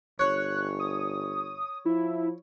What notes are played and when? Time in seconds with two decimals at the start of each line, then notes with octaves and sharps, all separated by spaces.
0.19 G1 C#5 F#6
0.79 D#6
1.86 F3 E4